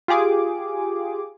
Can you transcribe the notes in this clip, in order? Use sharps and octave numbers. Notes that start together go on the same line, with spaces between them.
F4 G4 G#4 D6